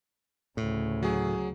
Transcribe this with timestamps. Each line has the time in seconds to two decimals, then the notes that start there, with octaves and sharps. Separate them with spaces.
0.57 D2 A2 C#3
1.03 F#3 G#4